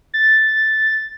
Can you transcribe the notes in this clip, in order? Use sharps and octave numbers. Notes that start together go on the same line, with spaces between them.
A6